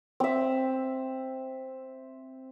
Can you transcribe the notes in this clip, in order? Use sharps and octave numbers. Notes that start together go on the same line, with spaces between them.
C4 E5